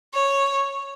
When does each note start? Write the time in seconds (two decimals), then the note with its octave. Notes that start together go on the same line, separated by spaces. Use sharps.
0.13 C#5